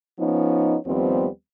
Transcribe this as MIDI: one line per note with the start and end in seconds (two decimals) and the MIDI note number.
0.19 0.77 53
0.19 0.77 59
0.19 0.77 61
0.19 0.77 63
0.86 1.27 39
0.86 1.27 53
0.86 1.27 55
0.86 1.27 59
0.86 1.27 60